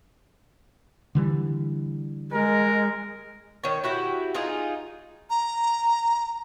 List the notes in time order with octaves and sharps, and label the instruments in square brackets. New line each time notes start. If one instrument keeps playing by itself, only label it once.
[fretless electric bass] D3 E3 G3
[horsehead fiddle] G#3 [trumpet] A#4
[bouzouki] D#3 C#5
E4 F#4 G4
D#4 F4 G#4
[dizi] A#5